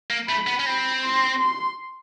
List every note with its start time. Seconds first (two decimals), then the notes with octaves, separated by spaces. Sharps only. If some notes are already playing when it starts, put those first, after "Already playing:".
0.10 A#3
0.28 A3 B5
0.47 B3
0.59 C#4
0.66 C4 B5
1.03 C6
1.39 C6